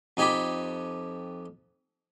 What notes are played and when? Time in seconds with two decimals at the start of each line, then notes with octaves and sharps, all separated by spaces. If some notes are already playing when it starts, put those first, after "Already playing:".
0.17 F2 D#4 G4 G#5 B5 D6